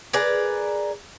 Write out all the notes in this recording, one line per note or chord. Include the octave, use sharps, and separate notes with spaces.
G#4 A#4 B4 D5